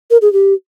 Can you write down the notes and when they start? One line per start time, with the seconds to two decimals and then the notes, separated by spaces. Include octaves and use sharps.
0.11 A#4
0.22 G#4
0.33 G4